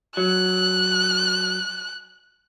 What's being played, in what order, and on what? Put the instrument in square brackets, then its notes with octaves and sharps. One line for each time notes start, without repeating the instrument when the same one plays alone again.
[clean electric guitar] F#3 [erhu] F#6